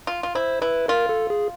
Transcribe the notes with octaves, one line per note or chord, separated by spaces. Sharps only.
F4
F4
E4 C5
E4 B4
F4 A#4
A4
G#4